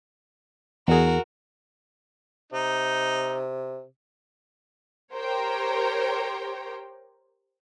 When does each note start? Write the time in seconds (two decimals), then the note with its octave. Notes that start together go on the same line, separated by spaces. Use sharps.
0.88 E2 F#4 G#4 A#4
2.53 C3 D#4
5.13 G4 A#4 C5 C#5 G5 A#5